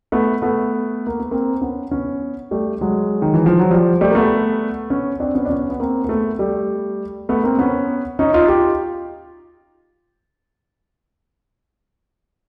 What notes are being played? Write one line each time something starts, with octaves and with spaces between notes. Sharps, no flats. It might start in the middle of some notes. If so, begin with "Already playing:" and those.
A3 B3
A3 B3
A#3
B3
A#3 C4
B3 C#4
B3 C#4
G3 A3
F#3 G#3
D#3
E3
F3
F#3
F3 G3
G3 A3
A#3
A3 B3
B3 C#4
C4 D4
B3 C#4
D4
B3 C#4
B3
A#3 C4
A#3
A3 B3
G3 A3
A3 B3
A#3 C4
B3 C#4
C#4 D#4
D#4 F4
F4 G4